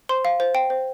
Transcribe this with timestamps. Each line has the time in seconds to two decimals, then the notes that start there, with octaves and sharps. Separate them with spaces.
0.09 C5 C6
0.25 F5
0.40 C5
0.55 G5
0.70 C5